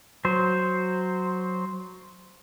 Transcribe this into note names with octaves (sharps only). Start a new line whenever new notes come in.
F#3 C5